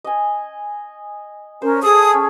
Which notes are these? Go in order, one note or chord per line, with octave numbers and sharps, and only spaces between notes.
D#5 G#5
C#4 A#4 C5
G#4 A4 D#6
C#4